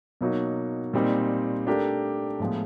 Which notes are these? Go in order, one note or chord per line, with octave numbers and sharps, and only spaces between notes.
B2 F#3 A#3 D#4 F#4
A#2 G3 C4 D#4
A3 D4 G4 A#4
A2 F3 G#3 B3